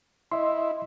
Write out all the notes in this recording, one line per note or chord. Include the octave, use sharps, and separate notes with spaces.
E4 D#5 E5 C6